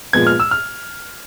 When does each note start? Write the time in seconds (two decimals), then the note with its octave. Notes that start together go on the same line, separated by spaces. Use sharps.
0.13 A#2 F3 G#3 B3 G#6
0.27 F6
0.40 E6
0.51 F6